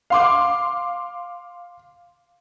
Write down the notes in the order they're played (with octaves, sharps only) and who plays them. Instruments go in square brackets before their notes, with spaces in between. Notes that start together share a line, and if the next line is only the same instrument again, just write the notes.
[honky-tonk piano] F5 C6 D6